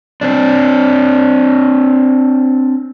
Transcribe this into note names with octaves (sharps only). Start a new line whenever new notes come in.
C4 D4